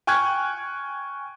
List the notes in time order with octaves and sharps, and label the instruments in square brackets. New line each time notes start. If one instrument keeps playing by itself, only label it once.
[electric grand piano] G5 G#5 C#6 F6 F#6 G#6